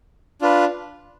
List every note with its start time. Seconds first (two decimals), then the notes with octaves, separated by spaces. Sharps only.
0.42 D4 F4 B4